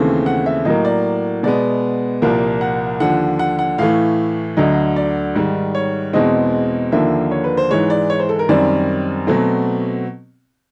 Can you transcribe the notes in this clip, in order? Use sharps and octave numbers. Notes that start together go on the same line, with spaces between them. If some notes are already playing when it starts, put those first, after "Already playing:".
Already playing: D#2 C#3 E3 A3 C4
F#5
E5
A2 F#3 A#3 D#5
D5
B2 G#3 B3 D5
C2 A#2 F3 A#3
F#5
D#2 D3 F3 F#5
F#5
F#5
A2 E3 A3 F5
D2 D3 F#3 D#5
D5
G#2 D#3 G3
C#5
E2 B2 G#3 C4 D#5
D#2 D3 F3 A#3 E5
C#5
B4
C5
G#2 E3 G#3 C#5
D5
C#5
C5
A4
A#4
F#2 D#3 G3 C4 D5
B2 F#3 A3 C4